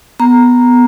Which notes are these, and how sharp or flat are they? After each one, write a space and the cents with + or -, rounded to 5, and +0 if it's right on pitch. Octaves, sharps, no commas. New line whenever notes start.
B3 +0 A#5 +0